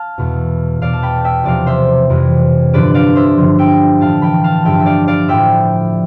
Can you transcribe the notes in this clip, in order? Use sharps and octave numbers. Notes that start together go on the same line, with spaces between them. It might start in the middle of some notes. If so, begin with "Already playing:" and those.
Already playing: F5 A5
E2 B2
E2 B2 D5 F5
A5
G5 B5
E5 G5
E2 C3 F3 D5 F5
C5 E5
F2 C3 E3
G2 D3 F3 B4 D5
D5 F5
C5 E5
G2 D3 F3
E5 G5
A2 E3 F5 A5
G5 B5
F5 A5
G2 D3 F3 E5 G5
E5
D5 F5
D5 F5
A2 F3 E5 G5